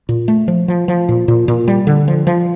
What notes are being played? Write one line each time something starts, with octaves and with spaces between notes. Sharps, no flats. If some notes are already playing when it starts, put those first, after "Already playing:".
A#2
A3
F3
F3
F3
A#2
A#2
A#2
G3
D3
F3
F3